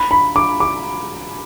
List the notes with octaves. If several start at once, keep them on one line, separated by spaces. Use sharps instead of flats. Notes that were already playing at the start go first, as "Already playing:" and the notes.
Already playing: B5
B5
D6
D6